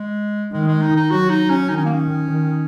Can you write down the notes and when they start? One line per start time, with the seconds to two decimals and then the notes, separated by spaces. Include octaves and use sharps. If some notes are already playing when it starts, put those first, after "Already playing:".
Already playing: G#3
0.52 D#3 G#3
0.67 G#3
0.82 D#4
0.96 D#4
1.11 F#3 F#4
1.30 D#4
1.50 C#4
1.69 D#3 D#4
1.77 C#4
1.85 A#3
1.94 C#4
2.27 D#3